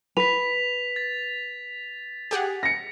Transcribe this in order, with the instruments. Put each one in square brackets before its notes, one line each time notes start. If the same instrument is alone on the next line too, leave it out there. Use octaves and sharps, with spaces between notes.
[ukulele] B4 [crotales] B6 F7
[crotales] A6
[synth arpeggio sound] G4 G#4 F#5
[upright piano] A#6 C#7